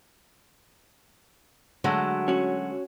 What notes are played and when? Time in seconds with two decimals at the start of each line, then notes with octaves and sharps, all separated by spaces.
1.84 D3 F#3 G#3 A3
2.28 C#4 F#4